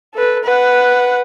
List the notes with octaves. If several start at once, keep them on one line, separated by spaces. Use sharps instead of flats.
A4 B4
B4 F#5